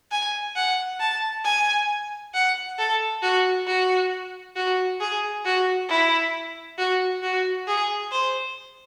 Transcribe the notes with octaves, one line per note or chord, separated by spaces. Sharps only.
G#5
F#5
A5
G#5
F#5
A4
F#4
F#4
F#4
G#4
F#4
E4
F#4
F#4
G#4
C5